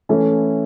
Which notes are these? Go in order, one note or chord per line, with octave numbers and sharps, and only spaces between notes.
E3 A3 C#4 E4 A4